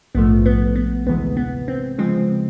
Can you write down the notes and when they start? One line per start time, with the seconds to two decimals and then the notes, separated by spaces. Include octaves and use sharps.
0.15 A#1 G#2 F3 A3 B3
0.46 B3
0.76 B3
1.07 D2 C3 E3 G#3 B3
1.37 B3
1.68 C4
1.98 C#3 F3 G#3 C4